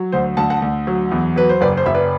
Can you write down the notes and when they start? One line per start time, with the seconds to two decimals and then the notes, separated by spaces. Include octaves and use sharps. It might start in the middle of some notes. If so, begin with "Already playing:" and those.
Already playing: F#3
0.12 D2 C5
0.37 D2 F#5 A5
0.50 F#5 A5
0.62 D2
0.87 F#3
1.11 E2
1.36 F#3 B4
1.49 C5
1.61 F#1 B4 D5
1.77 C5
1.86 F#1 E5
1.95 B4 D5